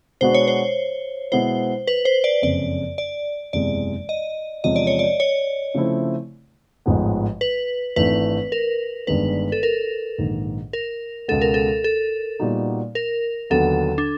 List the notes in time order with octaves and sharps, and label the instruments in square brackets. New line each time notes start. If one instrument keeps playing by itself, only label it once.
[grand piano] B2 G#3 B3 D4 F#4 [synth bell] C5
[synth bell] C#5
C5
[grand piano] B2 G#3 B3 E4 [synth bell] C5
[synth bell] B4
C5
D5
[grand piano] F#1 F2 C#3 [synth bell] D5
[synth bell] D5
[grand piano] F#1 E2 C3 E3 G#3 [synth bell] D5
[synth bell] D#5
[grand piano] E2 C3 F3 G#3 C#4 [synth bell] D#5
[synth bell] D5
C#5
D5
C#5
[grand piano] C#3 F3 A3 C4 E4
A1 G#2 F3 G#3 B3
[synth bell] B4
[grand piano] G#1 G#2 E3 A3 D4 [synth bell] B4
[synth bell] A#4
[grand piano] G1 G2 D#3 G#3 [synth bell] B4
[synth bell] A4
A#4
[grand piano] A#1 G#2 D#3
[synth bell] A#4
[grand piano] C#2 B2 G#3 B3 [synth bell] A4
[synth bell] A#4
A4
A4
[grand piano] A#2 G3 B3 D#4 F#4
[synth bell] A#4
[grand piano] D#2 D3 F#3 B3 [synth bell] A4
[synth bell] D4